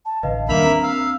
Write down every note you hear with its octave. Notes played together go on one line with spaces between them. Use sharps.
A5
A1 D3 B4 D#5 F5
D#2 D#3 G3 A#3 D4 E5 B5 F7
C4 A#5
F5 E6